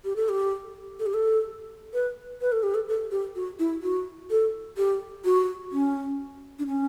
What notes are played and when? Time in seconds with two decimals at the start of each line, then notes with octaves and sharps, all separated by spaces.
0.04 G4
0.16 A4
0.29 G4
0.99 A4
1.06 G4
1.14 A4
1.94 B4
2.41 B4
2.52 A4
2.63 G4
2.74 A4
2.88 A4
3.11 G4
3.35 F#4
3.59 E4
3.82 F#4
4.30 A4
4.77 G4
5.25 F#4
5.72 C#4
6.59 D4
6.67 C#4